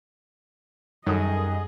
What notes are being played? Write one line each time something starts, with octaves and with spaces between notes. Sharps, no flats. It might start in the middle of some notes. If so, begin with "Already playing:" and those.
F#2 D#3 F#3 G3 G#4 A4 D#5 D#6